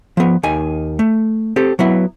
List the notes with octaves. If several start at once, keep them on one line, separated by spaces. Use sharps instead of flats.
F3 B3
D#2 D#3 G#5
A3
C4 G4 A4
F#3 B3 E4